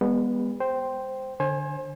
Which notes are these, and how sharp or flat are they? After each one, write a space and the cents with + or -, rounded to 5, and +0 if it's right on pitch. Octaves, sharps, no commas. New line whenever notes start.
G#3 -45 B3 -15
C5 +0 G5 -10
D3 +0 C5 +35 G#5 +5